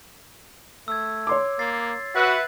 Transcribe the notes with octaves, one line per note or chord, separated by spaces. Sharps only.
A3 E6 G#6
C#5 C6 D6
A#3 A6 C7
F#4 B4 E5 F#5